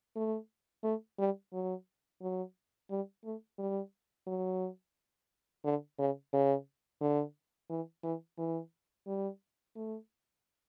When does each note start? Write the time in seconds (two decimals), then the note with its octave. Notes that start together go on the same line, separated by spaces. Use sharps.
0.16 A3
0.83 A3
1.18 G3
1.53 F#3
2.21 F#3
2.90 G3
3.24 A3
3.58 G3
4.27 F#3
5.64 D3
5.98 C#3
6.33 C#3
7.01 D3
7.70 E3
8.03 E3
8.38 E3
9.07 G3
9.75 A3